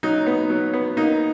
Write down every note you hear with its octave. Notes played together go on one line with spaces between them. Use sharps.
F#3 D#4
B3
F#3
B3
A#3 D#4